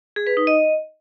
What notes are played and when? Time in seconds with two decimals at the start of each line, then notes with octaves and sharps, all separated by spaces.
0.16 G#4
0.27 B4
0.37 D#4
0.47 D#5